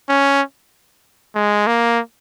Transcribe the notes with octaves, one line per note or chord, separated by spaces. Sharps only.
C#4
G#3
A#3